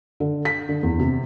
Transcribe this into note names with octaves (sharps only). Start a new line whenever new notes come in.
D3
B6
D3
E2
C3